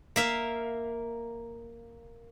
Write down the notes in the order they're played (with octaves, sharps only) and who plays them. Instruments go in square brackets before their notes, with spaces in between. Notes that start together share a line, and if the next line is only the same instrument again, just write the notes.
[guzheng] A#3 E5 F5